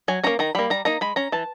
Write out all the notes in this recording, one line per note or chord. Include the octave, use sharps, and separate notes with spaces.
F#3 G#5
A#3 C#4 A#5
D#3 A#5
G3 A#3 B5
G3 A#5
A#3 D#4 A#5
G#3 B5
C#4 A#5
E3 A5